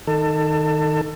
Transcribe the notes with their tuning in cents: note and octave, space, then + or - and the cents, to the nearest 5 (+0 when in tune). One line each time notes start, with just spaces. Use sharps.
D#3 +0 A4 +25